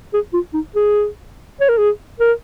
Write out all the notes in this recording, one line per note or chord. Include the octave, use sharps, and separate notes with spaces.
G#4
F4
D#4
G#4
C#5
A#4
G#4
A#4